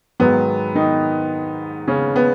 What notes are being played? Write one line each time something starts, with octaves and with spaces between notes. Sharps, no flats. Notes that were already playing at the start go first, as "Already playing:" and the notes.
G#2 D#3 F#3 B3
D#3 D#4
C#3 C#4
B3